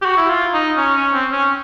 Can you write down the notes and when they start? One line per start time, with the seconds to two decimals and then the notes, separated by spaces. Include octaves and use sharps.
0.02 G4
0.05 F#4
0.17 E4
0.29 F4
0.53 D#4
0.77 C#4
0.96 C#4
1.13 C4
1.32 C#4